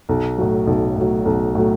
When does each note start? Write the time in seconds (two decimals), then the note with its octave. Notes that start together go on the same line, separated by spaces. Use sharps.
0.09 B1
0.38 A2 F#3
0.67 B1
0.96 A2 F#3
1.25 B1
1.55 A2 F#3